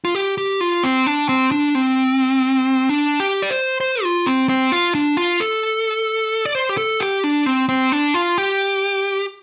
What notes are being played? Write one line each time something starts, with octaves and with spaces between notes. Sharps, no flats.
F4
G4
G4
F4
C4
D4
C4
D4
C4
D4
G4
D5
C5
C5
F4
C4
C4
F4
D4
F4
A4
D5
C5
G4
A4
G4
D4
C4
C4
D4
F4
G4